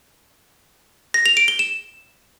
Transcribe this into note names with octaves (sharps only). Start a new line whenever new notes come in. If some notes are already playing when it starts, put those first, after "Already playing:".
A#6
F7
D7
G7
E7